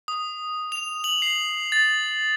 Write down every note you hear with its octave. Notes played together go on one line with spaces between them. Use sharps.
D#6
F7
F#7
C7
A6